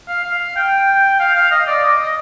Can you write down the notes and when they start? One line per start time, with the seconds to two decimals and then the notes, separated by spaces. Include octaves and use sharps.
0.08 F5
0.24 F5
0.56 G5
1.20 F5
1.36 F5
1.51 D#5
1.67 D5
1.83 D#5
1.99 D#5